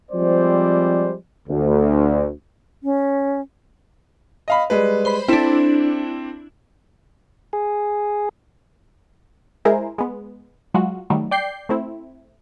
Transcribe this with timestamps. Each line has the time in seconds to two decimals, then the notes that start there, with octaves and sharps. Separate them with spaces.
0.12 F3 G3 G#3 C4 C5 D5
1.49 D2
2.83 C#4
4.48 D#5 F5 B5
4.70 G3 G#3 B4
5.05 C5 B5
5.28 C4 D4 E4 A4
7.53 G#4
9.65 G#3 E4 G#4 A#4 C5
9.98 G#3 B3
10.74 F#3 G#3 F4 F#4
11.10 D#3 F#3 G3 A3
11.31 D5 G5 G6 C7
11.69 A3 C4 E4